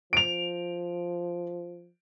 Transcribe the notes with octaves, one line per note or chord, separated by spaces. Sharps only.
F3 D7 F7